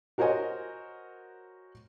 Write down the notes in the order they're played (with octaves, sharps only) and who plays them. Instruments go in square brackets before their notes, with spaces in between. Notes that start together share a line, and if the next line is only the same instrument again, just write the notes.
[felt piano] F#4 A#4 C5 C#5 D#5 G#5